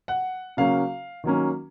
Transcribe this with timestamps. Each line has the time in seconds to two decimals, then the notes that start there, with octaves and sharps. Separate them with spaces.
0.08 F#5
0.57 C#3 F#3 A#3 C#4 F5
1.24 D#3 F#3 A#3 C#4